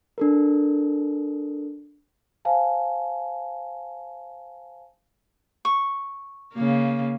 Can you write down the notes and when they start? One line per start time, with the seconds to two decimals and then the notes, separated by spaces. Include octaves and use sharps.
0.18 D4 A4 A#4
2.45 C5 F5 G#5 A5
5.65 C#6
6.54 C#3 A#3